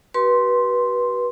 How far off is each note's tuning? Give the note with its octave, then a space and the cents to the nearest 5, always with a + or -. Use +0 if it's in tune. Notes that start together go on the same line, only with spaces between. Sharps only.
F#4 +45 B4 -20 C6 +0